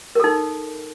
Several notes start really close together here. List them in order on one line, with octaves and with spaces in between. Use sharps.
A#4 A4 D#4